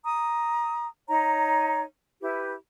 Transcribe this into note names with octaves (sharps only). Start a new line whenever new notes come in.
A#5 D#6
D#4 C#5 A#5
E4 G4 B4